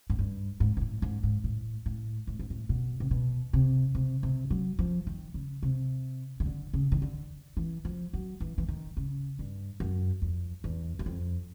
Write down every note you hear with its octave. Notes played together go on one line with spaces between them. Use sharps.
G#2
G2
G#2
G#2
A2
G#2
G#2
A2
A2
A2
G#2
A2
B2
C3
B2
C3
C3
C3
F#3
F3
D#3
C#3
C3
D#3
D3
C#3
D#3
D3
E3
F3
F#3
E3
E3
D#3
C#3
G2
F#2
F2
E2
F#2
F2